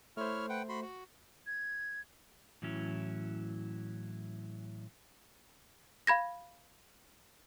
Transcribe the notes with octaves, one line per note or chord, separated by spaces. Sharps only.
A3 E4 C5 C#5 F6
B4 F#5 G5
F#4 B5 C6
F#4
G#6
A2 E3 F#3 C#4 E4
F5 B5 G#6 A#6